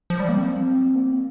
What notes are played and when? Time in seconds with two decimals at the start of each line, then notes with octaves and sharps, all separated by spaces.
0.10 F3
0.20 G3
0.29 A#3
0.37 C4
0.95 A#3